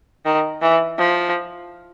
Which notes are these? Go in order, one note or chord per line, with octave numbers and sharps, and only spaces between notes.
D#3
E3
F3